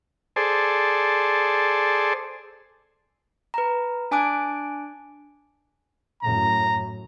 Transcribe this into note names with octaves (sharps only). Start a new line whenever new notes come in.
G#4 A4 C5 D5
B4 A#5
D4 G#5 A5 D6 F#6 D7
F#2 A2 A#5